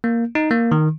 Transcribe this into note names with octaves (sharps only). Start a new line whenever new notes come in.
A#3
D#4
A#3
D#3